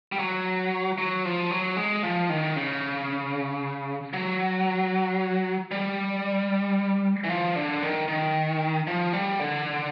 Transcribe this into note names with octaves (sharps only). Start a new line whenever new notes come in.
G3
F#3
F#3
F3
F#3
G#3
F3
D#3
C#3
F#3
G3
E3
F3
D3
D#3
D#3
F3
G3
D3